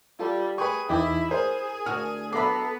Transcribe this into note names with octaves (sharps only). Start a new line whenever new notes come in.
G3 F4 A4
G#4 B4 G5 C#6
E2 E3 D#4 E4 G5 D6 D#6
G#4 A#4 C5
D2 F#4 F6
F#3 B3 A4 E5 A#5 B5 D6 C7